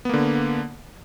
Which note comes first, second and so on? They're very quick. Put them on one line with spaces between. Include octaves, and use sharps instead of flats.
B3 A#3 D3